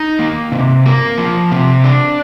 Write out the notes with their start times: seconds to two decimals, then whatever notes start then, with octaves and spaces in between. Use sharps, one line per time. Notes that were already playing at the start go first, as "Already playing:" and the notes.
Already playing: D#4
0.19 A#3
0.52 C3
0.86 A#3
1.18 F3
1.51 C3
1.84 D4